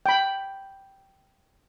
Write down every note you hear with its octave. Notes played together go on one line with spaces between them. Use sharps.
G5 B5